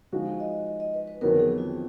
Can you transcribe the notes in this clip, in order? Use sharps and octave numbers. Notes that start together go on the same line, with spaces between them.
F3 G#3 D#4 F#4 F5
D#5
D#5
D#5
B4
B4
F2 D#3 F#3 B3 A#4
G#4
F4